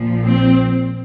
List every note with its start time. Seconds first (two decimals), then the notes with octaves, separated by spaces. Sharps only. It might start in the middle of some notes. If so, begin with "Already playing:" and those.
Already playing: A#1 A#2 F3
0.24 C4